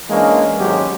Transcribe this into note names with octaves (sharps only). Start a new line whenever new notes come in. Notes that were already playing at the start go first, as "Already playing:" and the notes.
E3 G#3 A#3 C#4 D4
G#1 F#3 G#3 C#4 G4